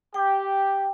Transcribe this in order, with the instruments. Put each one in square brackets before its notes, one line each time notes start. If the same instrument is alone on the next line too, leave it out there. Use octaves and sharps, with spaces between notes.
[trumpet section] G4 [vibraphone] G5